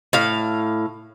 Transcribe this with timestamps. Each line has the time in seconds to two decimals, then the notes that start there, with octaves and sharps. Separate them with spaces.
0.13 A2 F5